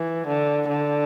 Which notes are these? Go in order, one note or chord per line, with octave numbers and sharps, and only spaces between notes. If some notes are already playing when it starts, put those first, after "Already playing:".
Already playing: E3
D3
D3